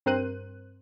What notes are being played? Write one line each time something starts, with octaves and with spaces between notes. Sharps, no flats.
G2 C4 A#4 C5 F#6 D#7